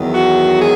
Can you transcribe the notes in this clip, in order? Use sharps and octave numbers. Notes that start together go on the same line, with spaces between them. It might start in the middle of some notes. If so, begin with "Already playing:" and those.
Already playing: E2 D#3 F#3
F#4
G#4